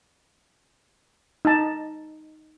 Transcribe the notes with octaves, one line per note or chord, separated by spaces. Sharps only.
D#4 A5